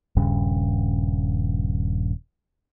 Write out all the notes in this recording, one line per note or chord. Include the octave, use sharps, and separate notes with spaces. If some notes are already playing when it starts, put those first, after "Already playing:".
D#1 G2 C#3